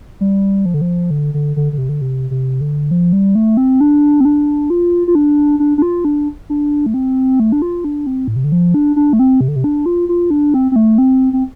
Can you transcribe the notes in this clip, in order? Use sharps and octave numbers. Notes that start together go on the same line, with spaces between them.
G3
F3
D3
F3
D3
D3
D3
D3
C3
D3
C3
C3
D3
F3
G3
A3
C4
D4
C4
D4
F4
F4
D4
D4
D4
F4
D4
D4
A3
C4
A3
D4
F4
D4
C4
A2
C3
D3
F3
D4
D4
A3
C4
C3
D3
C3
D4
F4
F4
D4
C4
C4
A3
C4
C4